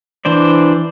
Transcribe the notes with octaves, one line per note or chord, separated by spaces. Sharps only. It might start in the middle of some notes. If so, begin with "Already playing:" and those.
E3 D4 C5 D5